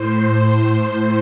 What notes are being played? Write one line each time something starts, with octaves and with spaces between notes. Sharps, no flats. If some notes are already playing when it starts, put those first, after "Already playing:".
Already playing: A2 C5
C5